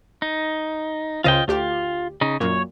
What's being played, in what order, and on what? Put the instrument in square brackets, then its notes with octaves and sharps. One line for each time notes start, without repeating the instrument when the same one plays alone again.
[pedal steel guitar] D#4
[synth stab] C#2 C#3 C5 [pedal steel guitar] F4 D#5 G5
[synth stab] D2 G4 [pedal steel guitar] F4
[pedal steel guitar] C#3 D#4
[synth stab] F#2 A#2 [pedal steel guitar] C#5